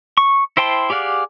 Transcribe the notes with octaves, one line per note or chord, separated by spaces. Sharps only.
C#6
E4 C5 G5 A5 C6
G4 G#4 D5 F5 F#5